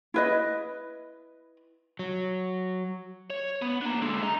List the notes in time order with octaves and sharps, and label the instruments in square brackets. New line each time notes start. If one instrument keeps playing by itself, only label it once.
[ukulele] E4 B4 D#5
[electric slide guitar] F#3
[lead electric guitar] C#5
B3
A#3 D4
D3 G#3
D#5 A#5